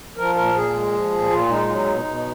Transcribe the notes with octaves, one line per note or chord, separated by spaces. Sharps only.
F3 A#4
A#2 A#4
A#2 G#4
G#3
F3
A#2
A#2 F4
G#3 D#4
F#3
B2
B2